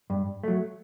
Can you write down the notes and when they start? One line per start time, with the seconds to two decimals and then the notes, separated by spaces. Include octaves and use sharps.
0.10 G2
0.43 F#3 A3